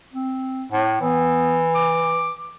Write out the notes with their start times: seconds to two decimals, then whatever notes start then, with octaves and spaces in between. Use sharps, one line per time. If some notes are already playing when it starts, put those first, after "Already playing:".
0.14 C4
0.72 A2
1.01 E3 B3
1.75 D6